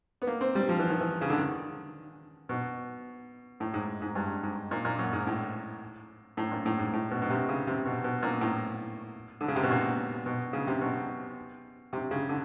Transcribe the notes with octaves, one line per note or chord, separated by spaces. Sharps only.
B3
A#3
C4
G3
F3
E3
D#3
E3
C#3
D3
D#3
B2
A2
G#2
G#2
G2
G#2
A#2
A#2
F#2
G#2
A2
A2
A#2
A2
G#2
A2
B2
B2
C3
C#3
C3
B2
B2
A#2
A2
D3
C#3
C3
B2
A#2
B2
C#3
C3
B2
C3
C#3
D3